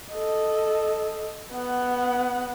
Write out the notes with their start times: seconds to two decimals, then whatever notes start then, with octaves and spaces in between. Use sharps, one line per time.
0.12 A4 D#5
1.52 B3 F#5